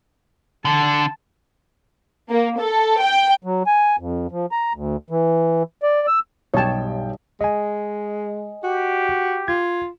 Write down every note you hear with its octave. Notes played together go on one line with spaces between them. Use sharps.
D3 A5
A#3
A4
G5
F#3
G#5
F2
F3
A#5
D2
E3
D5
E6
B1 G2 D#4 C#5 G5 A5
G#3 D#5 G#5
F#4 G4
F4 G#6